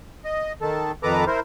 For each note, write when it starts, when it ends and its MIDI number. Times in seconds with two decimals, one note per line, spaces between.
0.25 0.52 75
0.62 0.92 51
0.62 0.92 69
1.03 1.25 41
1.03 1.25 51
1.03 1.25 69
1.03 1.25 71
1.03 1.25 82
1.03 1.25 86
1.27 1.40 64
1.27 1.40 70
1.27 1.40 72